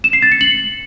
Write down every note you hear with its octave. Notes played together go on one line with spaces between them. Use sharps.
E7
C7
A6
C#7
F#7